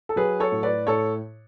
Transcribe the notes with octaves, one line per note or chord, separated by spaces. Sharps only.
A4
F#3 G#4 B4
A4 C#5
A2
B4 D5
A2 A4 C#5